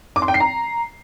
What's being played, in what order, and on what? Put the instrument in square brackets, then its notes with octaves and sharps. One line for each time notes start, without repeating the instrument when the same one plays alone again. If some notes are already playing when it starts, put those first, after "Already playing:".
[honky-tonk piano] D6
C6
G5
C7
A#5